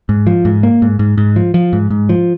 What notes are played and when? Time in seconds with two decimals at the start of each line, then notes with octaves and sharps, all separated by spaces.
0.09 G#2
0.27 F3
0.45 G#2
0.63 A#3
0.82 G#2
0.99 G#2
1.17 G#2
1.36 F3
1.54 F3
1.73 G#2
1.90 G#2
2.09 F3